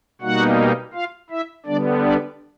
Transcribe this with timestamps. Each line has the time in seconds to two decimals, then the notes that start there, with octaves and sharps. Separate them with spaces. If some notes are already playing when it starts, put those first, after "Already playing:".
0.22 B2 G3 A#3 D#4 F#4 F#5
0.93 F4 F5
1.30 E4 E5
1.66 D3 G3 B3 D4 D5
2.03 D4 D5